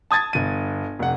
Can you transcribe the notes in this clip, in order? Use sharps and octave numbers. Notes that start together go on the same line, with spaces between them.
A5 D#6 G#6 A6
G1 D#7
F1 F#5